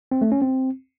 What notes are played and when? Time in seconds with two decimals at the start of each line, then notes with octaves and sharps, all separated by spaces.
0.12 C4
0.22 A3
0.32 C#4
0.42 C4